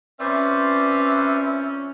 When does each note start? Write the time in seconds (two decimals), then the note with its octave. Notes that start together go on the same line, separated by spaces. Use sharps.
0.20 F2 C#4 B4 C5 D5 E5